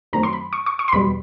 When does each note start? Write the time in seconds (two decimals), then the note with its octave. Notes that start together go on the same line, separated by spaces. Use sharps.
0.13 F#2 D#3 F#3 A3 C4 A#5
0.23 C6
0.33 B5
0.53 C#6
0.66 C#6
0.79 C#6
0.88 C6
0.92 E2 B2 G3 B5